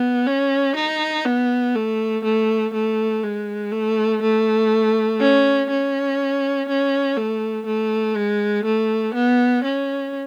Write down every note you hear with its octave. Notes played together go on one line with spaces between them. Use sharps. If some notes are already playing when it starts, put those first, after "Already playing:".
Already playing: B3
C#4
D#4
B3
A3
A3
A3
G#3
A3
A3
C#4
C#4
C#4
A3
A3
G#3
A3
B3
C#4